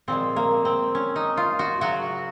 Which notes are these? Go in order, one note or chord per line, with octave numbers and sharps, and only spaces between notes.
A#2 F3 G#3 C4
A#3
C4
C#4
D#4
F4
F#4
C#3 F#3 F#4